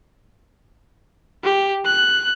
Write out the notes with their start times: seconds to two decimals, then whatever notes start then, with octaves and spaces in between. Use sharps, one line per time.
1.44 G4
1.86 F#6